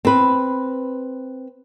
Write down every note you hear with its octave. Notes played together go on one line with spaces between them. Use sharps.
C4 B4